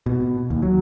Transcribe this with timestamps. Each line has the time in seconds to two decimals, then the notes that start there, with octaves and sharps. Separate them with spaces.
0.06 B2
0.50 D#2
0.62 F#3